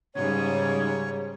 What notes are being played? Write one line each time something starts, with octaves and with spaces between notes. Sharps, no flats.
G#2 C#3 G3 C#5